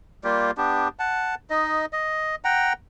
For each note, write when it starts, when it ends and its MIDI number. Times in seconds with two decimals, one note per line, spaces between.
0.24 0.51 55
0.24 0.51 58
0.24 0.51 65
0.24 0.51 67
0.57 0.88 59
0.57 0.88 62
0.57 0.88 67
0.99 1.35 78
0.99 1.35 81
1.50 1.85 63
1.50 1.85 75
1.93 2.35 75
2.45 2.73 78
2.45 2.73 79
2.45 2.73 82